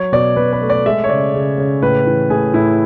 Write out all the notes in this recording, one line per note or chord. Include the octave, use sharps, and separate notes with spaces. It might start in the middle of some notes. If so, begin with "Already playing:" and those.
Already playing: F#3 C#5
B2 D5
B2 B4
B4
A3
D5
G#3 E5
C#5
C#3 D5
C#3
C#3
A2 B4
E3
A2 G#4
A2 E4